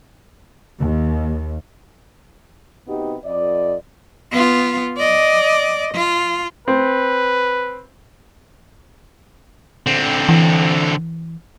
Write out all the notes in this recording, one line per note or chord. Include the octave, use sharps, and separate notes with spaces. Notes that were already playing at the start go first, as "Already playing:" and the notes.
D#2
C3 B3 D#4 F#4 G4
F2 D5 D#5
B3 F4
D5 D#5
F4
C4 B4
D3 C4
E3